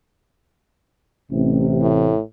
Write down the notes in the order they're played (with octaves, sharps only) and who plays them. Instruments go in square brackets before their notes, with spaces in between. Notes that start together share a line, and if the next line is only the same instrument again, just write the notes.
[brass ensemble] A1 C3
[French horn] A2